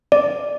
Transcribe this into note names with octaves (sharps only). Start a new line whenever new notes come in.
D5